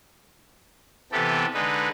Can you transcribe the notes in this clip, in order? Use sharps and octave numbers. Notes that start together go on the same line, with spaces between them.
C3 E3 B3 G4 A4
D3 G#3 D#4 B4